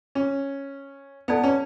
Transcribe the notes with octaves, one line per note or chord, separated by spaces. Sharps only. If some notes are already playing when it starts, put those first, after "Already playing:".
C#4
B3 E4 A4 D5 A5
C#4